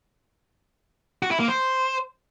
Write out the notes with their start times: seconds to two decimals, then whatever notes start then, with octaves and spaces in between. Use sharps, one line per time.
1.23 F#4
1.31 E4
1.39 A#3
1.48 C5